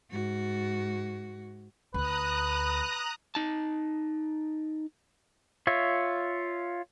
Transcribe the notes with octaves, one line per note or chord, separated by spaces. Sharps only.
G#2 F#4
D2 B4 A#5 D#6 F#6
D#4 A5
F4 C#5 E5